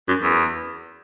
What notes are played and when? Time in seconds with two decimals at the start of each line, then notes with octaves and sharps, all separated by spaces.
0.08 F#2
0.22 E2